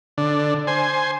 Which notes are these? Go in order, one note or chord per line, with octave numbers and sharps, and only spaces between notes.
D3
C5 G#5